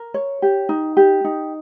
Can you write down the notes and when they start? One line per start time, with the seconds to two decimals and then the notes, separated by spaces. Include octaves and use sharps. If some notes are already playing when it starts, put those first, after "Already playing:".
Already playing: A#4
0.14 C#5
0.42 G4
0.69 D#4
0.97 G4
1.24 D#4